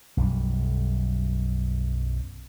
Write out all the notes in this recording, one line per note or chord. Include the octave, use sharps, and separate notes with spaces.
B1 F#2 G3